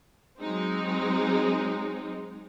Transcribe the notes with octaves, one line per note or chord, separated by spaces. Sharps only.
F#3 G#3 C4 D#4